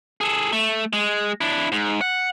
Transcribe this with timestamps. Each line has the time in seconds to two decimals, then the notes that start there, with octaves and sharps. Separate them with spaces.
0.21 G#4 A4
0.53 A3
0.93 G#3
1.41 D4 E4
1.72 G#2
2.01 F#5